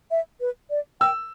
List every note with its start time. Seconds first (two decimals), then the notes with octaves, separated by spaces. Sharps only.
0.11 E5
0.40 B4
0.70 D5
1.01 G5 E6